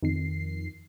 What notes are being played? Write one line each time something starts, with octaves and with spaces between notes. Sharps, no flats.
F2 D#3 C7